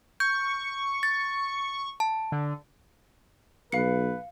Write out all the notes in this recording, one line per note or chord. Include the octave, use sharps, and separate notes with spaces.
C#6 G6
A6
A5
D3
B1 B4 F5 C#7